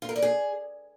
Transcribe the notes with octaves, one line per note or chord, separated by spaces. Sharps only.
F4
A#4
D5
G#4